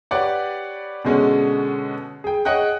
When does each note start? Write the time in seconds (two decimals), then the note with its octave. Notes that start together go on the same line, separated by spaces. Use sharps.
0.11 G4 B4 C#5 D5 F#5
1.05 B2 D3 G#3 C#4
2.24 G#4 G5
2.45 G#4 C#5 D#5 F#5 G5 F#6